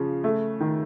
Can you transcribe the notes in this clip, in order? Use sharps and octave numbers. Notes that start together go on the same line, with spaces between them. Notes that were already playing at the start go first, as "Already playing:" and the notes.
Already playing: C#3 F3
A3
D#3